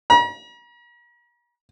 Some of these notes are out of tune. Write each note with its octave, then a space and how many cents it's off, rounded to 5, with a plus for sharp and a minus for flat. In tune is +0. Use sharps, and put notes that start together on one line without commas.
A#5 +45